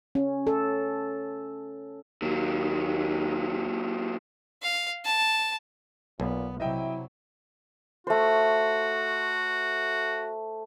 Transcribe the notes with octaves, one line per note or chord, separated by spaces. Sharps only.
C#4
A4
D#2 A#2 F#3
F5
A5
B1 A#2 B3
C3 F#3 E4 D#5 E5 G5
A3 F#4 C5